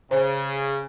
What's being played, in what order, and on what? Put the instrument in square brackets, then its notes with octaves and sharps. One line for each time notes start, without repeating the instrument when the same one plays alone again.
[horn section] C#3 [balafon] C5